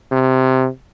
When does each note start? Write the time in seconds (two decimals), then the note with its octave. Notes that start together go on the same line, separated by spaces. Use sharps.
0.12 C3